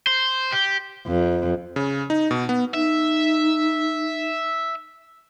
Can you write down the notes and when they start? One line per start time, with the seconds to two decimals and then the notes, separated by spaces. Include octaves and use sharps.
0.07 C5
0.52 G4
1.07 F2
1.76 C#3
2.10 D#4
2.31 B2
2.49 B3
2.74 D#4 E5